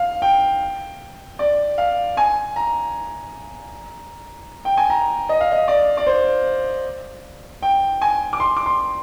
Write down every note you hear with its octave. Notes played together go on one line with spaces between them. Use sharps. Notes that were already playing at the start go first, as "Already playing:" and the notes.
Already playing: F5
G5
D5
F5
G#5
A#5
G5
G#5
A#5
D#5
F5
D#5
D5
D5
C5
G5
G#5
D6
C6
D6
C6